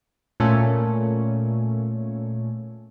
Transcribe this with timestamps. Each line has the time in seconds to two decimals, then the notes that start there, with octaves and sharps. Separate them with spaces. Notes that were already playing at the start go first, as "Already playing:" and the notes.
0.40 A#2 A3 C#4